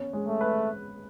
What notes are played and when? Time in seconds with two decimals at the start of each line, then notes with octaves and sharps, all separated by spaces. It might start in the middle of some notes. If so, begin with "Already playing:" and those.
Already playing: B3 C#4
0.13 G#3
0.27 A3
0.41 B4